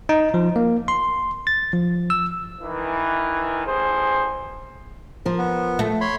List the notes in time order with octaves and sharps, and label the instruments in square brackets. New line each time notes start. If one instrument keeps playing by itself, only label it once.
[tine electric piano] D#4
F3
A#3
C6
A6
F3
E6
[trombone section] D#3 E3
A1 G#4 C5
[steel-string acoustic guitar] F3 A#4
[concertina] B3
[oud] A3
[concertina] C#5 B5 C6